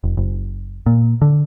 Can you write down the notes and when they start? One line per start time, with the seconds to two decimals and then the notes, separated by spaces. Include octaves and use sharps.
0.04 F1
0.17 F#1
0.86 A#2
1.22 D3